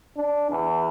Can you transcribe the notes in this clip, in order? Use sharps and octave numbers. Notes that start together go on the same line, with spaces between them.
D4
E2